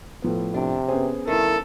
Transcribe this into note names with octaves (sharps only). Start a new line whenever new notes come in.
A2 F3 B3
C3 D4
B3 C#4 G#4 C5
G2 C3 D#3 E4 A4